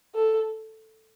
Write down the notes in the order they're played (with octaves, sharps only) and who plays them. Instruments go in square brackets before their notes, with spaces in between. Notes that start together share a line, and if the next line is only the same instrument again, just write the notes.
[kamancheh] A4